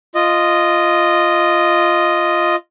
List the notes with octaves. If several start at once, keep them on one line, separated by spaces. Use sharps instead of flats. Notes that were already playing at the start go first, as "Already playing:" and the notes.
F4 D#5